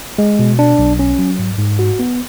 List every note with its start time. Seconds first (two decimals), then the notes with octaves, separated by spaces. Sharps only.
0.18 G#3
0.39 B2
0.59 D4
0.79 B1
0.99 C#4
1.19 F#3
1.39 G#2
1.59 G#2
1.79 F#4
1.99 B3